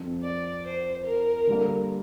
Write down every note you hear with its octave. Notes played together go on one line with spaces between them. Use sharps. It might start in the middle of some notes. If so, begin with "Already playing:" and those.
Already playing: F2 F3 C4
D5
C5
A#4
D3 G3 A#3